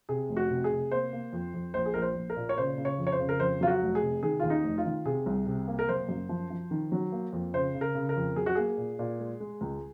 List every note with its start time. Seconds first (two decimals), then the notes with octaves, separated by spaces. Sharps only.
0.09 C3 G#4
0.29 F1
0.37 F#4
0.51 C3
0.64 G#4
0.71 C3
0.91 A#3 C5
1.13 A#3
1.33 F2
1.54 F2
1.74 A#1 C5
1.86 G#4
1.94 A#1 A#4
2.02 C5
2.15 A#1
2.30 A#4
2.36 A#2
2.49 C#5
2.57 C#3 C5
2.78 C#3
2.85 C#5
2.99 F2
3.07 C#5
3.12 C5
3.19 C#3
3.29 A#4
3.40 F2 C5
3.61 F#3 F4
3.67 F#4
3.82 F1
3.95 G#4
4.02 C3
4.23 D#3 G#4
4.40 D#2 F4
4.50 D#4
4.64 F1
4.78 F4
4.85 D#3
5.05 C3 G#4
5.26 C2
5.47 C3
5.68 A#3
5.79 A#4
5.88 F#1 C5
6.09 F#2
6.29 F3
6.50 F3
6.71 D#3
6.92 F#3
7.12 A#3
7.33 F2
7.54 C#3 C5
7.75 C#3
7.81 A#4
7.95 C#3
8.09 A#4
8.16 F2
8.36 F#3 G#4
8.46 F#4
8.55 A#3 G#4
8.77 A#2
8.99 A#2
9.19 G#3
9.40 G#3
9.61 C#2